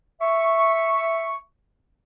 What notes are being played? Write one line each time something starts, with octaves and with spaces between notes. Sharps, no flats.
E5 C#6